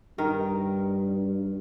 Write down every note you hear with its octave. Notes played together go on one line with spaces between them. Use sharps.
G2 D#3 A#4